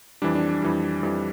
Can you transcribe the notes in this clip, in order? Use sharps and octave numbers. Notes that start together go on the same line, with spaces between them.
F2 E3 G3 D4
D4
D4
F2 E3 G3
F2 E3 G3